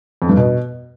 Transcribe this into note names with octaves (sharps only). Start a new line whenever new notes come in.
F2
G2
B2